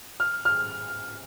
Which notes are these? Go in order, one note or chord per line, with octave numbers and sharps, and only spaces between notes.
F6
F6